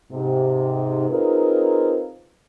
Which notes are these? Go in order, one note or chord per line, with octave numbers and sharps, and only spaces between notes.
G#2 C3
C4 D#4 F4 G#4 A#4 B4